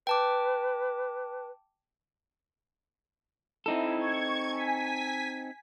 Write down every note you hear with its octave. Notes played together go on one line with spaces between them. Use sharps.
B4 G5 A5 D6
C4 D#4 E4 A4
C#6 G#6
G#5 B6